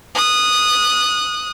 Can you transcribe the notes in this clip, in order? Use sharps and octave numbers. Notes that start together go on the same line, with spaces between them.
D#6 F#6